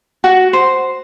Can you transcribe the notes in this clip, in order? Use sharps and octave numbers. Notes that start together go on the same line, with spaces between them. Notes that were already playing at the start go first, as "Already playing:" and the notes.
F#4
C5